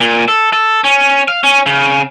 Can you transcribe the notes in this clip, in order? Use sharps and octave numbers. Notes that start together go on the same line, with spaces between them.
A#2
A4
A4
C#4
F5
C#4
C#3